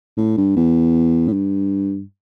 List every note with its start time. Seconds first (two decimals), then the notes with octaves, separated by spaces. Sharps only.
0.17 A2
0.37 G2
0.56 E2
1.28 A2
1.33 G2